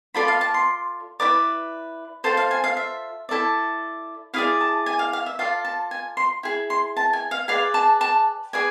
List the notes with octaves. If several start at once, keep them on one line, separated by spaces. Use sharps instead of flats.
F4 A4 D5 B5
F5
A5
C6
E4 B4 D5 D6
F4 A4 C5 C6
F5
G#5
F5
E5
E4 A4 D5
E4 G#4 D5 F5
A5
G#5
F5
F5
E5
F4 A4 D5 F5
A5
G#5
C6
E4 G#4
C6
A5
G#5
F5
G#4 B4 D5 F5
A5
A5
G#4 B4 D5 G#5